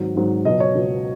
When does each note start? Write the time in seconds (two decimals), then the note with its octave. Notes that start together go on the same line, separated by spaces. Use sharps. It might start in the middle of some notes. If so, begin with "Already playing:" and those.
Already playing: G#1 G#2 F#3
0.15 G#1 G#2 F#3
0.45 C#2 B2 F#3 D#5
0.60 C#5
0.75 C#2 B2 F#3